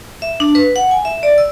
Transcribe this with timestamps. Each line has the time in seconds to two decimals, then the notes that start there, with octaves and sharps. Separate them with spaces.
0.22 E5
0.40 D4
0.55 B4
0.76 F#5
0.91 G#5
1.05 E5
1.23 D5
1.38 E6